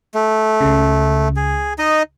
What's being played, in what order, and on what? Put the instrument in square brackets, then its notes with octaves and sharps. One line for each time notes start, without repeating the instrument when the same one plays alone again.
[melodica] A3
[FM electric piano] C#2 C#3
[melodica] G#4
D#4 D#5